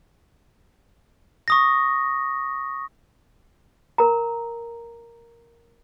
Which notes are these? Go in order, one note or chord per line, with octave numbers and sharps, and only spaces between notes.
C#6 D#6 A#6
A#4 A#5